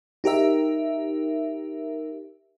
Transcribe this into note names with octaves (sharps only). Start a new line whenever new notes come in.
D#4 G4 A#4 E5